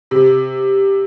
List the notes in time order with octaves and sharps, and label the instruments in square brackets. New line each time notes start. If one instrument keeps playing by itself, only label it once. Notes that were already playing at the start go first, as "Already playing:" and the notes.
[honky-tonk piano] C3